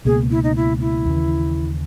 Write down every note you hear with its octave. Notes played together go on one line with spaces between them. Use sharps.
C#2 B2 A#3 G#4
E4
D#4
E4
E4
D#2 C#3 E3